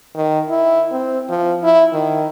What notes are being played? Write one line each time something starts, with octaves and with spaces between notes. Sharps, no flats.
D#3
E4
C4
F3
E4
D#3